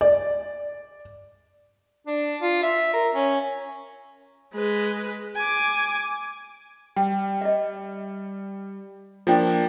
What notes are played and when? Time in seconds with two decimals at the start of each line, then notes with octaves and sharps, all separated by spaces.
0.01 D5
2.07 D4
2.42 F4
2.63 E5
2.94 A#4
3.14 C#4
4.54 G#3 B4
5.36 G#5 D6
6.96 G3 G5
7.41 D#5 E5
9.27 F3 A#3 D4 F4 G5